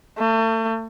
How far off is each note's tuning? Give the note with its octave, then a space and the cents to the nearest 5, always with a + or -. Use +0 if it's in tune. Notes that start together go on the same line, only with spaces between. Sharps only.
A3 +35